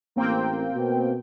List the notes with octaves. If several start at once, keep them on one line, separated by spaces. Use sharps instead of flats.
A1 A#3 C4 G5
B2